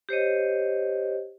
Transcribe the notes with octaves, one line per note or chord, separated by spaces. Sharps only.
G4 C5 C#5 D#5